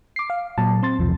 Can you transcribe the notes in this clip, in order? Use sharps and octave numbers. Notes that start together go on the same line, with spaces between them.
D6 C7
F5
A#2 F#3 A5
C4 C6 A6
B1 E2 C3 F3